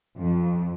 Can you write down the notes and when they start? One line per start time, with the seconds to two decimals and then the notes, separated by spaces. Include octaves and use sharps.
0.16 F2